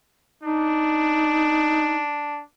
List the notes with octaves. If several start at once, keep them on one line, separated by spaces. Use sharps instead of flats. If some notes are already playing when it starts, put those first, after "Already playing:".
D4 D#4